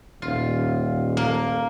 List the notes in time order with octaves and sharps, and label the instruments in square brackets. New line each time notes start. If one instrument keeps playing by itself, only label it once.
[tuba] D#1 [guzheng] F4
[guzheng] A#3